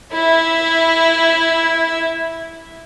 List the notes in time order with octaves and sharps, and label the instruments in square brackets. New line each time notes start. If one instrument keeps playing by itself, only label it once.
[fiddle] E4 E5